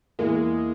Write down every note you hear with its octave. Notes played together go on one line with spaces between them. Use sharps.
E2 E3 G#3 A#3